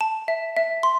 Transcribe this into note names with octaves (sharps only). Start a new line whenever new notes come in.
A5
E5
E5
C6